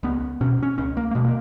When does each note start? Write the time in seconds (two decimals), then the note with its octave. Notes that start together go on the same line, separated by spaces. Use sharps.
0.03 C#2 B3
0.41 B2 C#4
0.63 C#4
0.78 C#2 C#4
0.97 A#3
1.11 A#3
1.15 B2 G#3
1.25 A#3